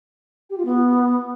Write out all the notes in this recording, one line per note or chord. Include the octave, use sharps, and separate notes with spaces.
G4
F4
B3